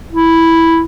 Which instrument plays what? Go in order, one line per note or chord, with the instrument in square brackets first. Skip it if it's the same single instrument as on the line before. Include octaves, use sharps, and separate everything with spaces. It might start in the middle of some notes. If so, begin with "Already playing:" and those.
[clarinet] E4